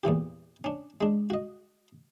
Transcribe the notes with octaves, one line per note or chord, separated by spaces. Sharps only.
E2 A#2 E3 G4
C#4 D4
G#3 D4
F#4 D#5